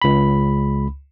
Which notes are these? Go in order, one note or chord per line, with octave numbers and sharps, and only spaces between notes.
C#2 B5